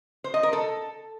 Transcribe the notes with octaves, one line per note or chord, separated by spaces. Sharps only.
C5
D#5
A#4
A4